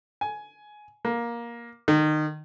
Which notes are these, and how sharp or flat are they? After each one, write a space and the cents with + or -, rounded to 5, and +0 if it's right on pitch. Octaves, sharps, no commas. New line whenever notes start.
G#5 +15
A#3 +15
D#3 -25